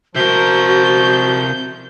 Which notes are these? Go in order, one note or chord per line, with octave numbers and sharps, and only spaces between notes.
C3 F3 F#4 A#4 G6